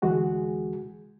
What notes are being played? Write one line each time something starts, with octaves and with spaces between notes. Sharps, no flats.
D2 E3 G#3 F#4 G#4